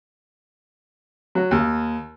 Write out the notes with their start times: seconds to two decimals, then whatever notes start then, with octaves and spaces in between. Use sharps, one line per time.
1.35 F#3
1.51 D#2